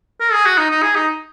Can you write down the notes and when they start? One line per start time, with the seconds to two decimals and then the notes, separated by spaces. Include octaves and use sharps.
0.20 A#4
0.32 G#4
0.45 F#4
0.58 D#4
0.70 D#4
0.83 G#4
0.96 D#4